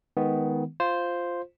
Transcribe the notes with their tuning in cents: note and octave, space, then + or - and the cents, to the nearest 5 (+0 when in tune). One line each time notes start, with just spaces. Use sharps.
D#3 +20 G#3 +15 B3 +5
F4 +0 C5 +0